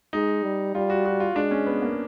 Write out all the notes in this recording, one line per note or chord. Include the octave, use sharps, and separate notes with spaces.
G#3 D#4
G3
G3 F4
F#4
F#4
F4
G#3 D4
C#4
B3
A#3